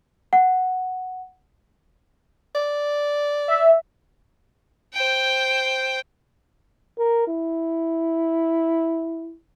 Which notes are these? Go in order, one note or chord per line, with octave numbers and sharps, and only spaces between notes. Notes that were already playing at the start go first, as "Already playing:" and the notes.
F#5
D5
E5
C5 G5
A#4
E4